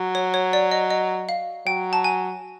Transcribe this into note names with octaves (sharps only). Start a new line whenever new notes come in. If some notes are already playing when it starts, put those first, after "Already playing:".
Already playing: F#3
C#5
C#5
D5
D#5
D#5
F5
F#3 G5
A5
G#5